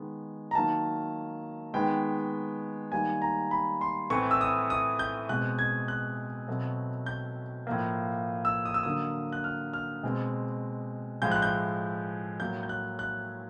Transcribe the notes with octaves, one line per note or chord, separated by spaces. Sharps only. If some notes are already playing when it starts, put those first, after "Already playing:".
Already playing: D#3 G#3 B3
A#5
D#3 F#3 A#3 A5
D#3 G#3 B3 G5
D#3 G3 A#3 G#5
A#5
B5
C6
A2 E3 A3 C4 C#6
E6
D#6
D#6
G6
B2 G#3 C4 F#6
G#6
F#6
B2 F#3 A3 C4
G6
A2 F3 A#3
E6
D#6
E6
D3 F#3 A#3 D#6
F#6
F6
F6
B2 G#3 C4
A2 F3 G#3 G6
F#6
G6
A2 F#3 A#3 G6
G6
F#6
F#6